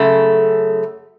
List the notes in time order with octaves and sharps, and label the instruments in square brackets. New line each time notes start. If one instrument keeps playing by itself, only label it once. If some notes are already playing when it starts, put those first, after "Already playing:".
Already playing: [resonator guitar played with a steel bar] F#2 C#3 A3